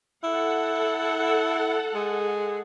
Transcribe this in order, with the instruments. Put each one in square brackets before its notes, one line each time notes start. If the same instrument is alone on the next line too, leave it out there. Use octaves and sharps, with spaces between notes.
[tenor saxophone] E4 [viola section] A4 F#5
[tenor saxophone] G#3